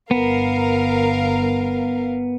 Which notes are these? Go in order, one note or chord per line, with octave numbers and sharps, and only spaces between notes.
G1 B3 A#4 F5